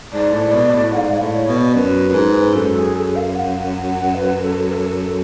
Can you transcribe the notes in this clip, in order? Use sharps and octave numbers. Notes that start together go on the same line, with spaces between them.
G#2 D5
A2
B2
A2
G#2 F5 F#5
G#2 D5
A2
C#5
B2
D5
F#2 B4
F#2
G#2
F#2 A4
A4
G#4
A4
F5
F#5
B4
A4
B4
A4